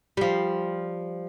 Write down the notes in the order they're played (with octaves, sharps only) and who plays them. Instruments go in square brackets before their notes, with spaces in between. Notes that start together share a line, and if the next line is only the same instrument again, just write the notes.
[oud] F3 G3